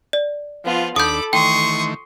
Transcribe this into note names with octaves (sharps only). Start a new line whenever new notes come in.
D5
F3 B3 F4
D#2 D4 A4 B5 D6 D#6 G6
D#3 E3 A3 G5 C6 C#6 D#6